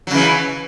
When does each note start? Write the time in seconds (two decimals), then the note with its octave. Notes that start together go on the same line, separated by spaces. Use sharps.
0.07 F#3
0.11 C#3
0.14 E3